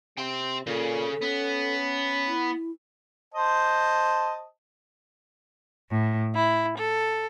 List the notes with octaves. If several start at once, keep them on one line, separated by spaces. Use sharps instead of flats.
C3 G5 C6
A#2 C#3 A4
B3 C#4
E4
C5 D#5 A5
A2
E4
A4